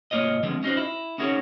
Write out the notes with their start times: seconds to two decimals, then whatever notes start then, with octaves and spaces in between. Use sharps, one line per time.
0.11 C2 G#2 A#3 F4 C#5 D#5
0.43 D3 E3 F3 G#3 B3 C4
0.63 C#4 D#4 F4 F#4 C5
0.77 E4
1.18 C#4 D#4 F#4 G#4 A#4 C#5